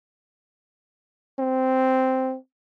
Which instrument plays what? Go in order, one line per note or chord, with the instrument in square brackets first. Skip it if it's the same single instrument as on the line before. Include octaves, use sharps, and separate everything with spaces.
[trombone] C4